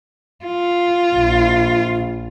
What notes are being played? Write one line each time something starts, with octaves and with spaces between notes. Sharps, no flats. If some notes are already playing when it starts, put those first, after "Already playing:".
F4
A#1